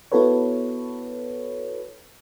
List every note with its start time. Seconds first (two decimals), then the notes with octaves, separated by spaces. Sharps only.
0.12 B3 E4 F#4 A4 B4 C#5